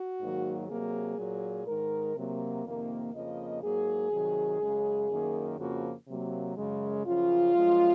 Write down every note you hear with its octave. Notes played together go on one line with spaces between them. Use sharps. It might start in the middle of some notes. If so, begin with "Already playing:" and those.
Already playing: F#4
G#2 D#3 F#3 A#3
C3 F#3 A#3 G#4
A#2 F#3 A#3
G#2 D#3 G#3 A#4
C3 F#3 A#3
F2 C3 D#3 A#3
F2 C#3 F3 A#3 D#5
G#2 F#3 A#3 G#4
C3 D#3 F#3
F#2 C#3 G#3
F#2 D#3 A#3
F2 C#3 F3 A#3 F#4
C3 F#3 A#3
F#2 C#3 G#3
F#2 C#3 F3 F4
F#2 F3 G#3